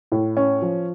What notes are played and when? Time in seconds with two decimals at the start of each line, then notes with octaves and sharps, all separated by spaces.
0.12 A2
0.37 C#4
0.62 F3